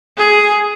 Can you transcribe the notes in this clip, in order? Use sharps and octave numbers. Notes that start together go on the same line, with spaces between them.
G#4